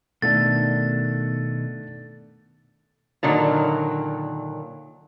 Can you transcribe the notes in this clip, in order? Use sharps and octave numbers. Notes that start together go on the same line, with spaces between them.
B2 D#3 A3 D4 A4 A6
A#2 D3 D#3 F#3